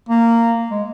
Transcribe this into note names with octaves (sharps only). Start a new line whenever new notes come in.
A#3
G#3